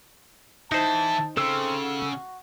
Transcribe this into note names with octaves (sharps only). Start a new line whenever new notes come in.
E3 D#4 E4 C5 A5
C#3 C4 A4 E6
F#4